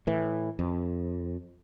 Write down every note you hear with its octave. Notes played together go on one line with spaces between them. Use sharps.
A2 E3
F2